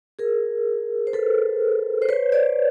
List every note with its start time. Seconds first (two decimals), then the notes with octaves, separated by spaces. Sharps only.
0.19 G#4 A#4
1.07 C5
1.13 A4 B4
2.02 C5
2.09 B4 C#5
2.32 C5 D5